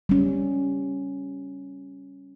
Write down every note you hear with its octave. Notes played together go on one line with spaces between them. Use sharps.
G3 C#4